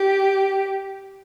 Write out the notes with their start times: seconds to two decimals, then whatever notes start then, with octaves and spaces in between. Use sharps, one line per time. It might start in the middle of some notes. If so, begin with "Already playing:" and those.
Already playing: G4